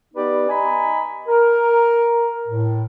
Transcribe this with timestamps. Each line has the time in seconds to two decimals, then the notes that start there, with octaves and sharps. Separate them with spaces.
0.14 B3 D#4 G4 B4 D5
0.50 D#5 G#5 A#5 B5
1.27 A#4
2.48 A2